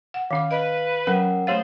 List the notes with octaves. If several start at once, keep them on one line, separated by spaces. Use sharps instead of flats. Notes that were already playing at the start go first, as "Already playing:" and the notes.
F#5
D#3 C#4 F5 D6
B4 D#5
F#3 C#4 A#4 F#5
A3 G4 C5 C#5 F5 A6